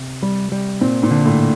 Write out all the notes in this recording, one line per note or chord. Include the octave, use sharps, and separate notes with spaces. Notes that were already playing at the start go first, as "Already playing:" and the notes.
Already playing: C3
G3
G3
A#2 C4
A#2
D3
A2